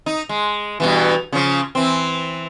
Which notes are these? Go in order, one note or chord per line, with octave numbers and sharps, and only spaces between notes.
D#4
G#3
G2 B2 E3
C#3 F3
E3 C4